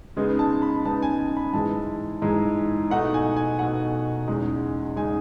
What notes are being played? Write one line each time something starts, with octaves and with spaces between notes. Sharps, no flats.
C#3 G#3 B3 D#4
A5
B5
C#3 G#3 B3 D#4 A5
G#5
G#5
B5
G#2 E3 G#3 A5
G#2 E3 G#3
B2 A3 D#4 F#5
G#5
G#5
B2 A3 D#4 F#5
E2 C#3 G#3 D#4
C#3 G#3 D#4 G#5